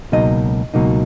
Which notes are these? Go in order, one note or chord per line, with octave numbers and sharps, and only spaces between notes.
C#2 B2 F#3 A#3 D#4 D#5
C#2 B2 F#3 A#3 D#4